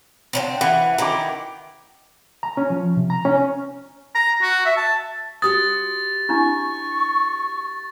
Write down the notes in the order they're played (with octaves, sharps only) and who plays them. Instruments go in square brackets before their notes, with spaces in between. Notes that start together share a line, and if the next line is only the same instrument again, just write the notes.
[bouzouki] D3 G3 C4
[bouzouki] E3 [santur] F#5
[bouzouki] D#3 E4 [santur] A#5 D6
[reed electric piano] A#5
C#4
F3
C3
A#5
C#4
[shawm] A#5
F#4
E5
A5
[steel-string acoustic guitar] F#4 G4 C5 [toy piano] D#6 [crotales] A6
[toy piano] D4 E4 [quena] C#6